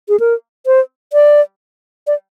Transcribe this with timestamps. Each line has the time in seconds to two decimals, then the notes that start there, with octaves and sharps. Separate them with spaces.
0.09 G#4
0.20 A#4
0.66 C5
1.13 D5
2.07 D5